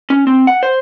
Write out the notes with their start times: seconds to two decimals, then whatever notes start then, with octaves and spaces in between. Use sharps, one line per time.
0.10 C#4
0.27 C4
0.47 F#5
0.63 C5